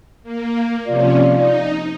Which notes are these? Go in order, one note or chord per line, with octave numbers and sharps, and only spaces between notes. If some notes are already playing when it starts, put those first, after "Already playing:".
A#3
C3 F3 C#4 F4 D5
D#4